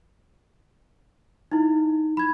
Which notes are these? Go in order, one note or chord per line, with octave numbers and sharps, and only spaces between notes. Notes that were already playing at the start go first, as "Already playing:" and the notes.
D#4 E4
B5 G#6